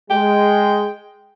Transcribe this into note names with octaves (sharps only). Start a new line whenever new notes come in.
G#3 G5